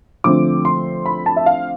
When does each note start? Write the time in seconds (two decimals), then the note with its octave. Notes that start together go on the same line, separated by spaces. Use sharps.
0.24 D3 F3 A3 C4 D6
0.65 C6
1.06 B5
1.26 A5
1.36 E5
1.46 F5